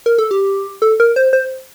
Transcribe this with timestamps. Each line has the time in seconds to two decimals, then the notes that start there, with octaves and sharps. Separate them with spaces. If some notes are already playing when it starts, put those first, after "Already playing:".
0.06 A#4
0.18 A4
0.31 G4
0.82 A4
1.00 A#4
1.16 C5
1.33 C5